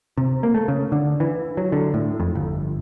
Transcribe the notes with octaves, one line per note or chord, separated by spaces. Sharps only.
C3
A#3
A3
C#3
D3
E3
F#3
D3
A2
F2
G1